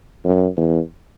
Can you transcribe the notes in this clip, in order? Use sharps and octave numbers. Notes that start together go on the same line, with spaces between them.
F#2
E2